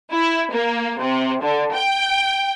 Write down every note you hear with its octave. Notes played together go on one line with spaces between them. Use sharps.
E4
A#3
C3
D3
G5